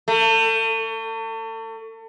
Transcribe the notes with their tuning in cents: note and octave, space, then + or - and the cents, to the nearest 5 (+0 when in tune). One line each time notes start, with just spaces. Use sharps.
A3 +35